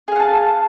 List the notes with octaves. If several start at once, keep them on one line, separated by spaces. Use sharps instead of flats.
G#4 F5 F#5 A5